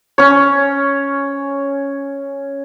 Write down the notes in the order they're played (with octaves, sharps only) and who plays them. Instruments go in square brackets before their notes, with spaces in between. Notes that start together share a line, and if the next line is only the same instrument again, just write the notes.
[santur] C#4 C#5